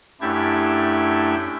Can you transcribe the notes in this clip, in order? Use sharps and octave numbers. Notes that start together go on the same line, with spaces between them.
F#2 A3 D4 E4 G4 G#6